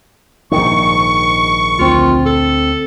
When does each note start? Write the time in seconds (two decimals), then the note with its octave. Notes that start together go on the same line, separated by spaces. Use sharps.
0.52 A#1 G#2 D#3 C#6
1.79 D2 C4 F4
2.25 A4